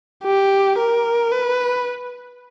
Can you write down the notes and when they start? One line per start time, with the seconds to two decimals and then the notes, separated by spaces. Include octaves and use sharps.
0.24 G4
0.78 A#4
1.32 B4